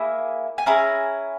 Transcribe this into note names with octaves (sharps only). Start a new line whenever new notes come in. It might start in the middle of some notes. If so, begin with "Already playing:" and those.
Already playing: A#3 E4 G#4
G#5
C#4 E4 G#4 A#5